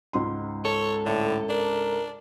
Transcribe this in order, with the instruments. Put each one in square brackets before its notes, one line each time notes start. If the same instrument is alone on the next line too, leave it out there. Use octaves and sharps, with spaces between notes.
[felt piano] C#2 G#2 C6
[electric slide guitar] A4 [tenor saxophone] C#5
[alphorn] A2 [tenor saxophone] D3
[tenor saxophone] D4 [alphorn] A#4